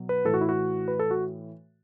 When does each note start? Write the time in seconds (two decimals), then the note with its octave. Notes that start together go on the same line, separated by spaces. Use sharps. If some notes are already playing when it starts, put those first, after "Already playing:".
Already playing: B2 F#3
0.09 B4
0.25 A2 E3 A4
0.34 F#4
0.41 E4
0.49 F#4
0.88 B4
1.00 A4
1.11 F#4